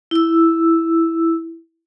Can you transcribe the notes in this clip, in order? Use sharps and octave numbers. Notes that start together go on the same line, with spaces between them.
E4 E6